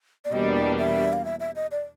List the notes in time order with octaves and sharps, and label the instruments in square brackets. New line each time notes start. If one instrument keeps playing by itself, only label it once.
[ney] D5
[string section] E2 B2 G3 A#3 D4 [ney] D#5
[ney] D5
E5
F5
E5
E5
D#5
D5